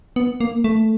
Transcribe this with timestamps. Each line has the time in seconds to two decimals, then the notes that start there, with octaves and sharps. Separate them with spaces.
0.16 B3
0.41 A#3
0.64 A3